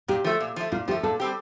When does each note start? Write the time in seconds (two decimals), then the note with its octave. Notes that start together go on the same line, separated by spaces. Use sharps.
0.08 A#2 G4
0.24 F3 A3
0.40 A#2
0.56 F3 A3
0.72 A#2 F4
0.88 F3 G4
0.91 A3
1.03 A#2 A4
1.20 G3 C4 G4